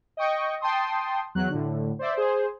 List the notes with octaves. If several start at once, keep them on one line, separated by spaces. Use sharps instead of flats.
D#5 G5 C#6
G5 A5 C6 D#6
E2 F#3 F#6
A2 D3
C5 D5 E5
G#4 C5